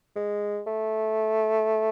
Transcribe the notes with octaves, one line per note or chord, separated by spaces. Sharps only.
G#3
A3